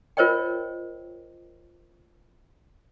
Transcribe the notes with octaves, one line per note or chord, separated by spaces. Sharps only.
F4 A#4 C5 C#5 D#5 G5